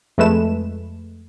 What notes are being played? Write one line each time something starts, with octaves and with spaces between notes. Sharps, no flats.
F2 G#3 A3 B4 E7